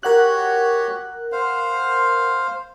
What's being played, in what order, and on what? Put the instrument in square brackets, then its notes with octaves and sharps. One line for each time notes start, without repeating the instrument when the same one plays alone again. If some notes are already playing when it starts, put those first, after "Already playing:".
[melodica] F#4 G4 C#5 [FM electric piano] A#4 F#5 F#6
[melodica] C5 F5